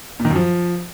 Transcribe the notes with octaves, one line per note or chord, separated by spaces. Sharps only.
A#2
D#3
F#2
F3